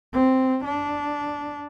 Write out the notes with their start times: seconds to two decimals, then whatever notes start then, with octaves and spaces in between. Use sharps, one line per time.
0.13 C4
0.65 D4